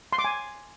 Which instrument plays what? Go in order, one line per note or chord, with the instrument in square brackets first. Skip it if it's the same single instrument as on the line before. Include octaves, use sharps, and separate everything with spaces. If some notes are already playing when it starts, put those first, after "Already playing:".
[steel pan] C6
D6
G#5